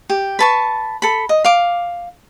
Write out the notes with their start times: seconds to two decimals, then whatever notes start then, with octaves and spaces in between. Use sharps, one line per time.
0.10 G4
0.39 B4 A5 C#6
1.02 A4 B5
1.29 D#5
1.44 F5 D6